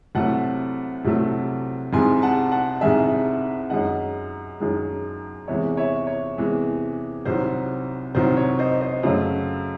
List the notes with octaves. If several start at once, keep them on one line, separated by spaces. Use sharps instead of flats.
C2 C3 F#3 A3 F#5 A5
C2 C3 F#3 A3
C2 C3 D#3 G#3 G#5 C6
F#5 A5
F#5 A5
C2 C3 D#3 G#3 E5 G#5
F#2 D#3 G#3 D#5 F#5
F#2 D#3 G#3
E2 C3 E3 G#3 C#5 E5
C#5 E5
C#5
E2 C3 E3 G#3
C2 C3 D#3 F#3 C5
C2 C3 D#3 F#3 C5
C#5
C5 D#5
C5 D#5
F#2 C#3 F#3 A3